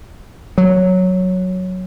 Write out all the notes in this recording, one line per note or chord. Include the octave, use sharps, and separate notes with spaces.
F#3